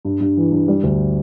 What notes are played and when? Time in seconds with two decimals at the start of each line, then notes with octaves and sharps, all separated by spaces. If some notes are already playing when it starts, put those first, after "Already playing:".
0.05 G2
0.21 G2
0.37 E3
0.52 G2
0.68 G3
0.83 D2